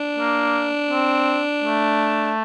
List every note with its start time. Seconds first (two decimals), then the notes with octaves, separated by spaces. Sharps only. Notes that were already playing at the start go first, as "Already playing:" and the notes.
Already playing: D4
0.19 A#3
0.91 C4
1.64 A3